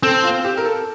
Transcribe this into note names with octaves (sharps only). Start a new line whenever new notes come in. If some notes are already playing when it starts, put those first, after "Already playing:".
C4 A4
F4
G4
A#4
A4